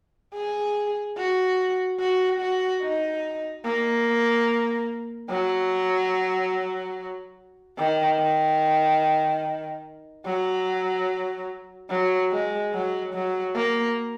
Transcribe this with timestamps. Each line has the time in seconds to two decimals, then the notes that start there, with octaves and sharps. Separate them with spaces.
0.34 G#4
1.17 F#4
2.00 F#4
2.40 F#4
2.82 D#4
3.64 A#3
5.30 F#3
7.78 D#3
8.19 D#3
10.26 F#3
11.90 F#3
12.31 G#3
12.74 F#3
13.14 F#3
13.56 A#3